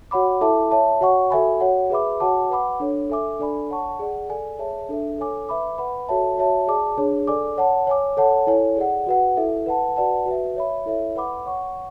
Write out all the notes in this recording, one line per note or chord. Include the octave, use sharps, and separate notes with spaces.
F#4 C#5 F#5 B5 D6
E4 A4 E5 A5 D6
C#5 E5 A5
F#4 C#5 F#5 C#6
F#4 A4 E5 G#5 B5
F#4 C#5 F#5
G#4 B4 E5 B5 D6
F#4 C#5 F#5 A5 D6
B4 F#5 B5 D6
D4 A4 C#5
A4 E5 G#5 D6
D4 A4 D5 G#5 B5
C#5 F#5 A5 C#6
G#4 D5 F#5
A4 D5 G#5
G#4 C#5 E5 A5
D4 A4 E5
A4 C#5 G#5 D6
B4 E5 B5 D6
B4 F#5 B5
F#4 A4 C#5 E5 A5
F#4 C#5 E5 A5
G#4 D5 A5 D6
D4 G#4 C#5
A4 D5 G#5 D6
C#5 F#5 A5
C#5 G#5 D6
A4 C#5 F#5 A5
E4 A4 C#5 G#5
G#4 D5 F#5
F#4 B4 F#5
E4 A4 E5
B4 F#5 A5
F#4 B4 D5 F#5 A5
F#4 B4 E5
C#5 E5 B5
E4 A4 C#5 E5
B4 F#5 B5 D6
C#5 F#5 C#6